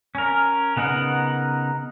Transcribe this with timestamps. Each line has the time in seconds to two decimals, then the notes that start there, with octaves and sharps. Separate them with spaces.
0.15 C#4 A#4
0.77 C#3 B3 D#4 A#4 F#5